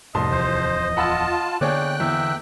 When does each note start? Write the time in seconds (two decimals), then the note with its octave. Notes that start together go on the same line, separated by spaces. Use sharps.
0.15 C2 F2 A2 D#5 A5 C6
0.31 D1 E2 F3 C5
0.97 F4 F#5 A5 B5 E6
1.61 D3 A#3 B3 G#4 C#5 D5 G5 F#6
2.00 E2 E5